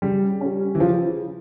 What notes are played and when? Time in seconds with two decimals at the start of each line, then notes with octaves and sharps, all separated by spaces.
0.02 C#3 G3
0.41 G3 C#4
0.75 E3
0.80 C#3 F3